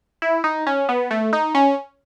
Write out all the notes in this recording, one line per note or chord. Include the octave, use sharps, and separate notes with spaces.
E4
D#4
C#4
B3
A3
D#4
C#4